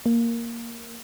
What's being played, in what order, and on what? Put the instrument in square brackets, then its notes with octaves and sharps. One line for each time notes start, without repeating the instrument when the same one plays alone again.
[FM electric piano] A#3